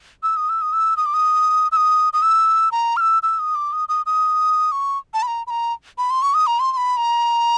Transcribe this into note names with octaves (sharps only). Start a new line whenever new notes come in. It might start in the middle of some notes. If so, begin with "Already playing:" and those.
E6
D#6
E6
D#6
E6
D#6
D6
D#6
E6
D#6
D#6
E6
A#5
F6
E6
E6
D#6
D6
D#6
D#6
D#6
C#6
A5
B5
A#5
B5
A#5
B5
C6
C#6
D#6
A#5
C6
C6
B5
A#5